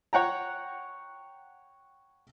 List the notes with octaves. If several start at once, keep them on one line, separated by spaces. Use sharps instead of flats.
C#5 F#5 G5 A#5